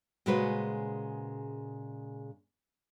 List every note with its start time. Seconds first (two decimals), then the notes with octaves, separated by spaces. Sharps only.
0.26 A#2 C#3 G#3 F#4 B4 C5